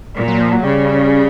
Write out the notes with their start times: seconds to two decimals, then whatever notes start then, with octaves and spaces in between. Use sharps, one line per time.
0.15 A#2
0.28 F#3
0.41 F3
0.52 F#3
0.64 C#3 G3